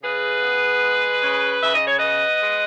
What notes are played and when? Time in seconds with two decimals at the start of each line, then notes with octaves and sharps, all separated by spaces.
0.03 C#3 G#4 B4
0.42 B3
0.83 G#3
1.22 C#3
1.62 C#3 E5
1.74 D#5
1.86 C#5
1.98 B3 B4 D#5
2.42 G#3